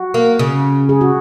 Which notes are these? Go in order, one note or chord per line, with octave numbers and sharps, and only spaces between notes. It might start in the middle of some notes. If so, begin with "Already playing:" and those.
Already playing: F#4
A#3
C#3
G#4
F#4